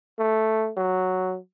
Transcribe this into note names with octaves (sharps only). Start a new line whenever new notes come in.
A3
F#3